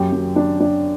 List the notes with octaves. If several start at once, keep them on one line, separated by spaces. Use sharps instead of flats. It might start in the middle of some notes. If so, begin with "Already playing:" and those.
Already playing: F#2 G4 G5
F#2
D4
D4